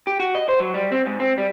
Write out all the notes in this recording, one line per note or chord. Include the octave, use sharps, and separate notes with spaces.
G4
F#4
D#5
C5
F#3
G3
C4
G#2
C4
G3